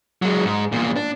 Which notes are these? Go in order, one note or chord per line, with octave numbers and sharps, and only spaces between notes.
F#3 G#3
G#2
E2 A#2
D4